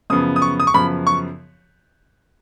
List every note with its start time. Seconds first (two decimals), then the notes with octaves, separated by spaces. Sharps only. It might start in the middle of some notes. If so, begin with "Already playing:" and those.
0.10 F#2 C#3 F3 B3 D#6
0.36 D#6
0.42 C#6
0.60 D#6
0.67 C#6
0.74 F#2 C#3 F3 B3 B5
1.07 C#6